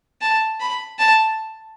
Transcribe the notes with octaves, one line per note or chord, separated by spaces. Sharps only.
A5
B5
A5